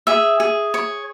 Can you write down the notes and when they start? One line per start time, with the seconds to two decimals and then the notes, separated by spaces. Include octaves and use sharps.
0.07 G#4 E5
0.40 G#4
0.74 C#5